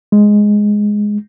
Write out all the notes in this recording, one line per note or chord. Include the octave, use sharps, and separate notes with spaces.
G#3